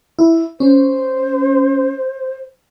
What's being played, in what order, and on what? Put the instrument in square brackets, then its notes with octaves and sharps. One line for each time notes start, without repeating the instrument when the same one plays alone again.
[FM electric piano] E4
[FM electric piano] C#4 [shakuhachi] C5